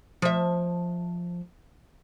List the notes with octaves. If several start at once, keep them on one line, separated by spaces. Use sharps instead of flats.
F3 E5